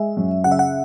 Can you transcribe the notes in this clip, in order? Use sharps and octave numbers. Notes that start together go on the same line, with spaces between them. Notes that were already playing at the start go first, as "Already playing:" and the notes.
Already playing: G#3 E5
F#2
C#3 F#5
E5
F#5